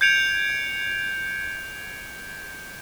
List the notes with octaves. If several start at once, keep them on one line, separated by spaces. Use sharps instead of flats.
G6 G#6 C#7 D7 F7